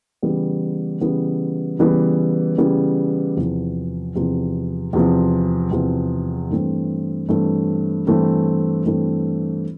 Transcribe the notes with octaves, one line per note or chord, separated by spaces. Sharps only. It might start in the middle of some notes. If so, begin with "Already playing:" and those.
C#3 E3 G3 B3
C#3 E3 G3 B3
C#3 E3 G3 B3
C#3 E3 G3 B3
E2 C3 F3
E2 C3 F3
E2 C3 F3
E2 C3 F3
G2 E3 A3 C4
G2 E3 A3 C4
G2 E3 A3 C4
G2 E3 A3 C4